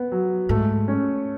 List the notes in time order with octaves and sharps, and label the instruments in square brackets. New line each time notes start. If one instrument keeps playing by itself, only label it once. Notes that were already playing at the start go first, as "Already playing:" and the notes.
Already playing: [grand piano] B3
F#3
[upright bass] G#2 [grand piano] A3
[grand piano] C#4